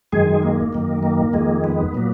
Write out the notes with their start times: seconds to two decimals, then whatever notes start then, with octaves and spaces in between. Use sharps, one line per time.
0.12 F#2 D#3 G#3 G#4
0.43 A#3
0.73 F#2 D#3 A#3
1.03 A#3
1.33 F2 D#3 G#3
1.64 B3
1.94 A#2 F#3 A#3